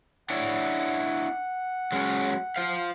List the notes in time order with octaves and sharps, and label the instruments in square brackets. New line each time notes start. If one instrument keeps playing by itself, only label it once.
[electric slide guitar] D4 E4 C#5 [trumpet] F#5
[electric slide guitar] F#3 G#3 C#4
F4 C5 F5